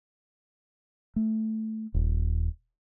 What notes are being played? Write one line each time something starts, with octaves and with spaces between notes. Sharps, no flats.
A3
D#1